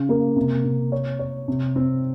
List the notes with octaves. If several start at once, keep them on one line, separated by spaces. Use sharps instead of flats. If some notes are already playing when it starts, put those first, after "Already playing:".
Already playing: C#3
A#3
C3
C3
C#5
C#5
C3
C4